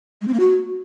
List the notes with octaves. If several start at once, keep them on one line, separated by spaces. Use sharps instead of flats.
G#3
C4
A#3
F#4